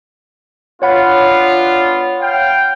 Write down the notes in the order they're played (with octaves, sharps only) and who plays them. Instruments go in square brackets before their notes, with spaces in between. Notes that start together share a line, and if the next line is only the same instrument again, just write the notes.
[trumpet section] B3 D4 F4 [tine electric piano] C#5 F#5 B5
[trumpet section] F5 G5